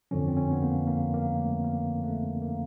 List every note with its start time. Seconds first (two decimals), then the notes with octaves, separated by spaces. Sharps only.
0.11 F2 D3 F3 C#4
0.28 C4
0.37 C#4
0.52 B3
0.62 A#3
0.87 A#3
1.14 A#3
1.39 A3
1.65 A#3
2.04 A3
2.42 A#3